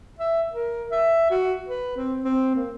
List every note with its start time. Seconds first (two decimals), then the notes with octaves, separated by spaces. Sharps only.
0.19 E5
0.53 A#4
0.91 E5
1.31 F#4
1.68 B4
1.97 C4
2.24 C4
2.55 A#3